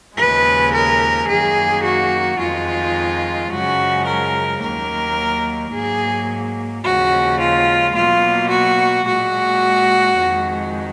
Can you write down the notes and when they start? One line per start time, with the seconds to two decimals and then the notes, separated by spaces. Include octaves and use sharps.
0.17 D#2 C#3 F3 G#3 B4
0.73 A#4
1.28 F#2 D#3 A#3 G#4
1.84 F#4
2.39 F2 D#3 G#3 F4
3.50 F#2 C#3 F3 G#3 F#4
4.06 A#4
4.61 D#2 D#3 F#3 A#3 A#4
5.72 G#2 F#3 A#3 G#4
6.83 D#2 C#3 F3 G#3 F#4
7.40 F4
7.95 B2 F#3 A#3 F4
8.50 F#4
9.05 A#2 G#3 F#4
10.17 F2 D#3 G#3